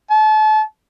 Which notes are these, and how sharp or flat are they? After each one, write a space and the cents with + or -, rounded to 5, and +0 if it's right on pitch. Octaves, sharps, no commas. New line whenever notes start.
A5 -35